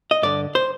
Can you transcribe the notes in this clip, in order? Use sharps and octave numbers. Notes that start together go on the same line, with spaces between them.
D#5
G2 D3 D5
C5